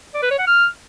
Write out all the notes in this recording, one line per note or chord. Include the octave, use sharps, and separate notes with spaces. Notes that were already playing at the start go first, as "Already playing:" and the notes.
D5
B4
C#5
F#5
F6